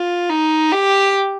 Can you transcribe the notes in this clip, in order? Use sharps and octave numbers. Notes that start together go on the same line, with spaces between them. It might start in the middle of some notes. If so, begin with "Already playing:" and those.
Already playing: F4
D#4
G4